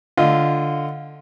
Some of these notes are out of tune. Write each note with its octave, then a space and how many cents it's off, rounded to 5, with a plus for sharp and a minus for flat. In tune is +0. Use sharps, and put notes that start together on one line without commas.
D3 +0 F4 +0 D#5 +0